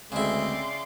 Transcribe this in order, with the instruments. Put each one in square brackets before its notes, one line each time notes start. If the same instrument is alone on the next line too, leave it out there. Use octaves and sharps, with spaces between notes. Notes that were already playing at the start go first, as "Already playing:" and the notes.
[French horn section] D2 G#3 [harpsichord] C#3 E4 [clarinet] C4 [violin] D5 C6